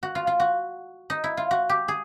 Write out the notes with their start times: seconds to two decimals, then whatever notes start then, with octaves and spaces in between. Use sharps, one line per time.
0.03 F#4
0.15 F4
0.27 F4
0.40 F#4
1.10 D#4
1.24 E4
1.37 F4
1.51 F#4
1.69 G4
1.88 G#4